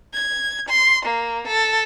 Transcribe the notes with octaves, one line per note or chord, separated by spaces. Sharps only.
G#6
C6
A#3
A4